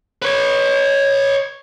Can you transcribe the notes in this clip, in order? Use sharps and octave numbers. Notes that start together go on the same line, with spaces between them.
B4 C#5